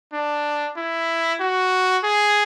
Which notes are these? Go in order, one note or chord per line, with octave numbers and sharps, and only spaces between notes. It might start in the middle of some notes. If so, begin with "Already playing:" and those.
D4
E4
F#4
G#4